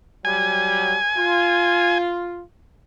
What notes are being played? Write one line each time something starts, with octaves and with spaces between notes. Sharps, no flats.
F#3 G3 G#5
F4